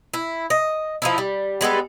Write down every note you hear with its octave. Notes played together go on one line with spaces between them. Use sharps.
E4
D#5
F3 D#4 E4
G3
G3 G#3 B3 A4